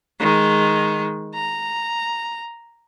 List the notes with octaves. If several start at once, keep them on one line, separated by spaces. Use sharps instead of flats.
D#3 G#3
A#5